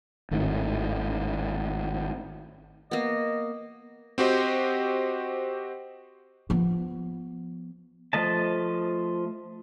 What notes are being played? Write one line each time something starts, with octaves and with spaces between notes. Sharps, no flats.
G#1 A2 D#3
A#3 B3 D#5
C4 F#4 G4 C5 D#5
F3 B3
F3 A3 D#5 A5